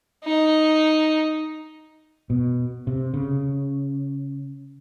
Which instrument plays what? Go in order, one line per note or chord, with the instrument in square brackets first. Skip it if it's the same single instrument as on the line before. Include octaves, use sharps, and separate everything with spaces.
[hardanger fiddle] D#4
[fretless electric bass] B2
C3
C#3